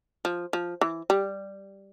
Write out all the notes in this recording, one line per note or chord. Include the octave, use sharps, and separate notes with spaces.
F3
F3
E3
G3